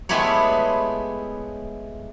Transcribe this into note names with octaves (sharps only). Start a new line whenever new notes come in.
G#3 A3 B3 E4 G4 C#5